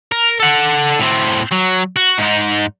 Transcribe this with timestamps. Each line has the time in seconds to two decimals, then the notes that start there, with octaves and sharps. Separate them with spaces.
0.12 A#4
0.40 A4 F#5
0.99 A2 C4
1.51 F#3
1.96 F#4
2.18 G#2 D#4